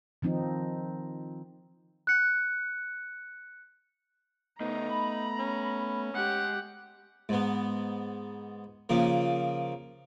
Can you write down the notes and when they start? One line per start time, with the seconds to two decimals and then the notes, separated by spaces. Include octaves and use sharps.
0.22 D#3 F3 C4 D#4
2.07 F#6 C#7
4.60 A2 C#3 A3 B3 D#4 A#5
4.89 B5
5.39 C#4
6.15 G#3 G4 F#5
7.29 G#2 B3
8.89 C#3 F3 A#3